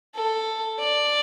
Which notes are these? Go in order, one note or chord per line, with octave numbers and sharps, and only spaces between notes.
A4
D5